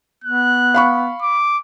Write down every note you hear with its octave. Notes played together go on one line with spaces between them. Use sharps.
B3 F#6
F5 B5 C#6
D6